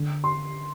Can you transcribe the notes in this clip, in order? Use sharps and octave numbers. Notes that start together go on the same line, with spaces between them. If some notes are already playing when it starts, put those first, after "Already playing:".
Already playing: D3
C6